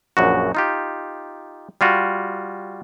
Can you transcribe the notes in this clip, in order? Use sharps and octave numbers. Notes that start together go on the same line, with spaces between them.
A#1 F#2 F#4
D#4 F4 G4
G3 F4 F#4